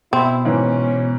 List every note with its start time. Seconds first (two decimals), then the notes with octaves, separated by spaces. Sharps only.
0.13 B2 C4 E4
0.45 G#2 E3 C#4